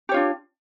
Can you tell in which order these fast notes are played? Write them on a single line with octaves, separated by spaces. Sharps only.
G4 C#5 F4 D4